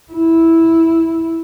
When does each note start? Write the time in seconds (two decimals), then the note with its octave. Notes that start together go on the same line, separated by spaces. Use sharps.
0.12 E4